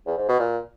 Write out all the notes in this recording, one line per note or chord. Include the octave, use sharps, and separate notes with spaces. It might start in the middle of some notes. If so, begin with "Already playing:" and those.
E2
G#2
B2
A#2